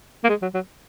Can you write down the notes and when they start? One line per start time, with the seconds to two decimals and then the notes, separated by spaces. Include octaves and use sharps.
0.24 A#3
0.29 G#3
0.42 F#3
0.54 F#3